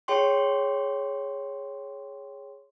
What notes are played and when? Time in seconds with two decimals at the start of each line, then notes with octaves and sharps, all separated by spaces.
0.08 G#4 C#5 G5 C6 C#6